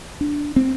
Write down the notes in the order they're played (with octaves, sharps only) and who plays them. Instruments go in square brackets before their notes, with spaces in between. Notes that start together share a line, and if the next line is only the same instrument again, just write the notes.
[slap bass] D4
C4